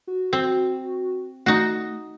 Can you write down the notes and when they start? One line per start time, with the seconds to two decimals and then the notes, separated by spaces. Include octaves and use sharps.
0.07 F#4
0.33 C4
1.46 A3 D#4 F#4